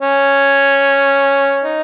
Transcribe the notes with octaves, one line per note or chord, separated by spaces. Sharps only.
C#4
D#4